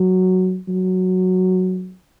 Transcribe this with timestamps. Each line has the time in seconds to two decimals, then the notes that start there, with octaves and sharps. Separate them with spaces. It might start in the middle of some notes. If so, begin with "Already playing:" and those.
Already playing: F#3
0.68 F#3